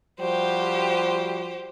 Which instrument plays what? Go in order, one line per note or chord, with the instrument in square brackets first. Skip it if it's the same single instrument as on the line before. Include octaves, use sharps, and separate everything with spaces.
[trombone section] F3 G3 F#4 [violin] G4 C5